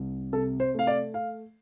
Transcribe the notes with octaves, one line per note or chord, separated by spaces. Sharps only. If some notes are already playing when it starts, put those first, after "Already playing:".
Already playing: C2
C3 A4
C5
A3 F5
D5
F5